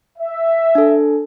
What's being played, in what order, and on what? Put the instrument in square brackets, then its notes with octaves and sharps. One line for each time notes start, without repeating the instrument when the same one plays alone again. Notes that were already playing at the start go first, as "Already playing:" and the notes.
[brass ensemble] E5
[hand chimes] D4 A4